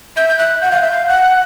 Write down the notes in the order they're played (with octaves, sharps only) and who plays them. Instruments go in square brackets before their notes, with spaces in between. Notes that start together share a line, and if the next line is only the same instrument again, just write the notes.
[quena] E5 [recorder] G6
[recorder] G6
[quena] E5 [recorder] F#6
[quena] F#5 [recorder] G6
[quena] F5
[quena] E5 [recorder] G6
[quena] F5
[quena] F#5 [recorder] F#6